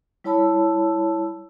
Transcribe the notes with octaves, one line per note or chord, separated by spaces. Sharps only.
G3 E4 C#5 A5 B5 E6